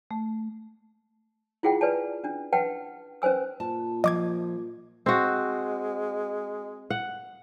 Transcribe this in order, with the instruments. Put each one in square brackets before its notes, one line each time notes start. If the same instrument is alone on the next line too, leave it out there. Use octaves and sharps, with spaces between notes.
[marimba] A3
[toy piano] E4 F4 G#4 F#5 G5
B4 D5 G#5 A5
C#4 D4
B4 F#5 G5 A5
C#4 B4 C5 G#5 E6
[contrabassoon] A#2 [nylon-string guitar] A5
[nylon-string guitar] F3 [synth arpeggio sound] D#5 D6 G#6
[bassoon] G#3 [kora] C4 F#4
[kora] F#5